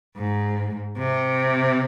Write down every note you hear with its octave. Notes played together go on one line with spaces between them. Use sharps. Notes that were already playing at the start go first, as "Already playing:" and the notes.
G#2
C3